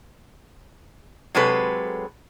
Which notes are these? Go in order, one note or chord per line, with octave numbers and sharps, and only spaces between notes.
C3 F#3 G#3 A4 B4